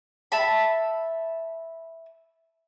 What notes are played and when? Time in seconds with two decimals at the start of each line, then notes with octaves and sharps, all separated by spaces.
0.32 E5 A5 B5